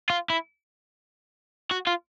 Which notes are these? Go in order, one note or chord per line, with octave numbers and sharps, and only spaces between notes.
F4
E4
F#4
F4